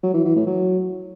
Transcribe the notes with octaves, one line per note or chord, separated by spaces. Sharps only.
F#3
E3
E3
A2
F#3